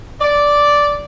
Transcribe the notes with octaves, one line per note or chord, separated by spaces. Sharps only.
D5